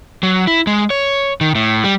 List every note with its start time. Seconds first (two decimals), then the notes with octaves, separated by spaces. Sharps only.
0.23 F#3
0.47 E4
0.67 G#3
0.90 C#5
1.41 D#3
1.55 A2
1.84 G3